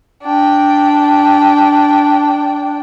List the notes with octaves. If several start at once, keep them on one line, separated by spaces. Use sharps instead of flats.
D4 G5